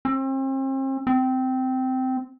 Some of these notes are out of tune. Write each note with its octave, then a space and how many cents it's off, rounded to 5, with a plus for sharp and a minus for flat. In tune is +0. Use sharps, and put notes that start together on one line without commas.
C4 +40
C4 -15